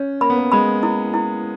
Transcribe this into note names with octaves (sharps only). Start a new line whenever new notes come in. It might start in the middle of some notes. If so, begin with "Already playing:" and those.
Already playing: C#4 C#5
A#3 B5
B3
A#3
G#3 B5
E4
E4